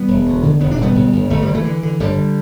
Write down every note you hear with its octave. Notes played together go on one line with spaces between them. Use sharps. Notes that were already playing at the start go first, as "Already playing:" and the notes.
Already playing: G3 B3
E1
D2
D3
E1 B3
D4
B2 G3 B3
G1
G1
G1 A3
G3
D3
E3 A3
D3
D3
G1 D3 G3